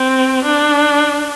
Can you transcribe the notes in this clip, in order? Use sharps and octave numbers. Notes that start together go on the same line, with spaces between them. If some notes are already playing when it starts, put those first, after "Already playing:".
Already playing: C4
D4